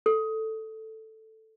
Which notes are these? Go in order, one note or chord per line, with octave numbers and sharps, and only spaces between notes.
A4